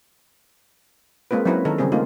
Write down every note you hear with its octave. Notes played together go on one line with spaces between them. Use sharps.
G#3 A#3 C4 F4 B4
F#3 C4 C#4 E4 A#4 B4
D#3 A4 A#4
C#3 G3 C4 G#4
A3 A#3 D#4 F4